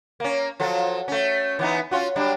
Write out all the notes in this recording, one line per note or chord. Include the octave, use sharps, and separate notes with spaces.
A#3 C#4
F3 F#3 A4
A3 C#4
E3 B3 D#4
C#4 F4 F#4
F#3 G3 D4